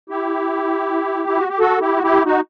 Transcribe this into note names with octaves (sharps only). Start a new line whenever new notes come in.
E4 G4
E4
F#4
G4
F#4 A4
E4 G4
F#4
E4 G4
D#4 F#4